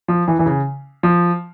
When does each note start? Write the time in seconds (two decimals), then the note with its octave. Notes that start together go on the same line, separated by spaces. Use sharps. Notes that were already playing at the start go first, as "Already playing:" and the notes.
0.08 F3
0.28 E3
0.39 E3
0.46 C#3
1.03 F3